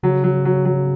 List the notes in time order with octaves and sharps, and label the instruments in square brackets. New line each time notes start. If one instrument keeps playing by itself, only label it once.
[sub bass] C#3 [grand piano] F#3
[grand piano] F#3
F#3
F#3